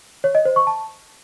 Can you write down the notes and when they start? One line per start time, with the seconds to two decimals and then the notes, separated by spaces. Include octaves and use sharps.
0.24 C#5
0.35 D#5
0.45 C5
0.56 C#6
0.67 A5